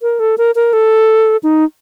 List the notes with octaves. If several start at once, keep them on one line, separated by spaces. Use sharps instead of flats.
A#4
A4
A#4
A#4
A4
D#4